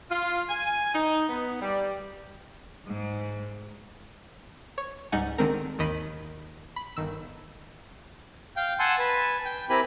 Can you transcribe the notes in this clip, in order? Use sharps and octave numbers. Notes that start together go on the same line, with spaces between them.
F4
G#5
D#4
B3
G3
G#2
C#5
C#2 G#2 G3 D#4 F#5 G#5
D3 D#3 G#3 C4 A#4
G#1 D#2 D#3 D#5 B5 D#7
B5
G1 D#3 E6
F5 G5
F#5 G#5 A5 C6 E6
B4 G#5 A5
G5
C4 E4 G4 A#4 G#5 B5